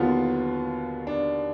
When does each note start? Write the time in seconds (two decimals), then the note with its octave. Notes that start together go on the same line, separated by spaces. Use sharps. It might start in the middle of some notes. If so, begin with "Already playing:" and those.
Already playing: D#2 D3 F#3 B3 F4
1.07 D4